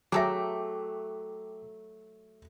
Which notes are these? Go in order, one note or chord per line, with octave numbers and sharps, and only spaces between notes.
F#3 A3 G#4 A4 E5 G5 A#5 D6